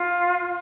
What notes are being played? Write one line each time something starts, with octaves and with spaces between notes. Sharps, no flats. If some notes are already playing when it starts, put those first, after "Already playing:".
Already playing: F4